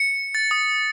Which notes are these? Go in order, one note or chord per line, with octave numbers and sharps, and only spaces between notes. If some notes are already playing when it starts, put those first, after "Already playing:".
Already playing: C#7
A6
D#6